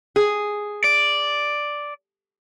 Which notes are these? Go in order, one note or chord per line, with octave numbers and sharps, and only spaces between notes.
G#4
D5